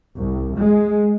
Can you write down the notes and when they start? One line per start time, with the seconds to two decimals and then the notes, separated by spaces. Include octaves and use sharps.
0.16 C2
0.57 G#3